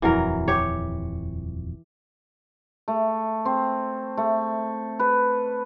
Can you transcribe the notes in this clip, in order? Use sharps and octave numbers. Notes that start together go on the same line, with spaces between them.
D#1 F2 E3 F#3 A#4
G4 C#5
A3
C4
A3
B4